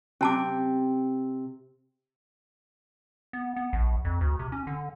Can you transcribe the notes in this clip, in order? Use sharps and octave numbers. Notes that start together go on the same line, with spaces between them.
C3 C#4 G5 A5 D6
B3
B3
A#1
F2
D2
C3
C#4
D3